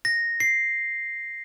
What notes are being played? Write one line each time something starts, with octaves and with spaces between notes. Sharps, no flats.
A#6
C7